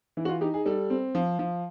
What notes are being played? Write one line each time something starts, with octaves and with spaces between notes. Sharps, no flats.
E3 E4
F#4
F4
D#4 G4
G#4
G3 A4
C4
F3
F3